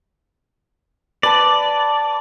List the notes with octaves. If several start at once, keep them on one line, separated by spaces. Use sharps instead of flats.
B4 D5 A5